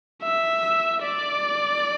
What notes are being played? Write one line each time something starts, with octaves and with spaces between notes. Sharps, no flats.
E5
D5